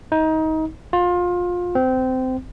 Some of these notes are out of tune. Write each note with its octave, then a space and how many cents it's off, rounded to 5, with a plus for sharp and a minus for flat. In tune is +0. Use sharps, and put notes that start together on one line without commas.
D#4 +25
F4 +25
C4 -20